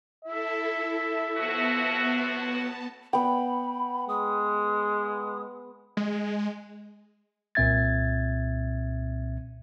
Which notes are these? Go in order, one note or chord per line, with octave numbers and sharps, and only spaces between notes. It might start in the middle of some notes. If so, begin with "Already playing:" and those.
E4 A4 E5
A2 F3 B3 F#4 A5
B3 G5 B5
G#3 D#6
G#3
C2 A#2 C4 E5 G#6 A6